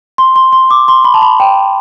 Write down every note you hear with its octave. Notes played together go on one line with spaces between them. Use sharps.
C6
C6
C6
D6
C6
B5
A5
B5
G5